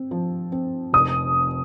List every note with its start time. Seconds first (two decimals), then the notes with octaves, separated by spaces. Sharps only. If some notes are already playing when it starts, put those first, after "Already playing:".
Already playing: C4
0.11 F3
0.52 C4
0.93 F1 D#6